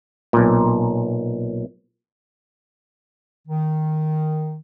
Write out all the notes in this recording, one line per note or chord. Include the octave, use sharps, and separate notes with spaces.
B1 A#2
D#3